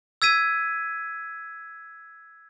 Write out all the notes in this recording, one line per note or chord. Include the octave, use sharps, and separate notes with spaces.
E6 G#6 B6 D#7